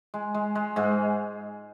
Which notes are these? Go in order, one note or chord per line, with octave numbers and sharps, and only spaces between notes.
G#3
G#3
G#3
G#2 G#3